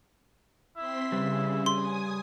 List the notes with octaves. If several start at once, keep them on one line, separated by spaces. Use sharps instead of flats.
C4 E4 C6 B6
C#3 G3 B4
G#5 C6 D#6